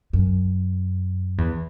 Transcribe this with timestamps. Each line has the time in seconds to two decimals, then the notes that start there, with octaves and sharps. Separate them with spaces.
0.13 F#2
1.38 E2